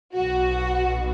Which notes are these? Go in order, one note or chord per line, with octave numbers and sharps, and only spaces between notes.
B1 B2 F#4